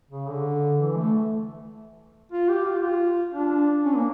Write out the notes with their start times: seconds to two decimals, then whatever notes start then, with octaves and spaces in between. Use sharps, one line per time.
0.11 C#3
0.28 D3
0.79 E3
0.97 A3
2.32 F4
2.49 G4
2.66 F4
2.77 G4
2.82 F4
3.34 D4
3.84 C#4
3.96 A#3